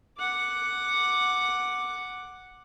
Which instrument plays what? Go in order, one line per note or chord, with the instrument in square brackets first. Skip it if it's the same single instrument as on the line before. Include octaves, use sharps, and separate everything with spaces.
[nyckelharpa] F#5 D6